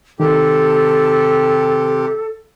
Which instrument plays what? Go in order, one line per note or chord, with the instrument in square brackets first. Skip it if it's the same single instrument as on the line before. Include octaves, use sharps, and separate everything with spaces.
[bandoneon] C3 G4 [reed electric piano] D#3 [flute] A4